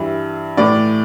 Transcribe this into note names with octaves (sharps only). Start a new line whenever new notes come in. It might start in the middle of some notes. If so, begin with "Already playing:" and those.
Already playing: G2 E3 E5
A2 E3 D5